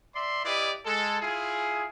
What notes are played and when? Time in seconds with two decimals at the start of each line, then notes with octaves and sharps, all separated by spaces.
0.15 D5 E5 C6
0.45 E4 G4 B4 D5 D#5
0.86 G#3 A4
1.21 E4 F4 G#4